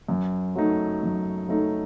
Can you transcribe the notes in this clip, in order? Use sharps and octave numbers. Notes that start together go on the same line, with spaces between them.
F#2
F#3 A3 D#4
F#2
F#3 A3 D#4